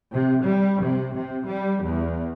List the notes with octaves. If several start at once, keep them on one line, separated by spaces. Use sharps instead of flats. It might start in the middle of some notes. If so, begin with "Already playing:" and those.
C3
G3
C3
C3
G3
E2